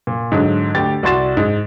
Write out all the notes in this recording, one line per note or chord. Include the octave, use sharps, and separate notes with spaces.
A#2
G#2 D3 F#3
D2 G4 A6
C2 F#4 D5 C6 A6 E7
G#2